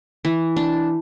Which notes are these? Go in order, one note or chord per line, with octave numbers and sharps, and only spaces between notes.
E3
D4